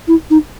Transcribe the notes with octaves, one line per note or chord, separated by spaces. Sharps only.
E4
D#4